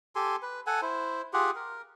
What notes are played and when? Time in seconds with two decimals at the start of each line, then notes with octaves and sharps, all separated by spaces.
0.15 G4 A4 G#5 C6
0.42 B4
0.67 A4 F#5 G#5
0.82 E4 C5
1.33 F4 G4 G#4 F#5
1.55 A#4